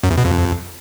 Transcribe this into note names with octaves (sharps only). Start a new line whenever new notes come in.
F#2
E2
B2
F2